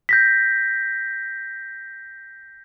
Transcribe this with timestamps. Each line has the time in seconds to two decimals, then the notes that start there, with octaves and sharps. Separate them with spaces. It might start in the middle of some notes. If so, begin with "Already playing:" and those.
0.09 G6 A#6 B6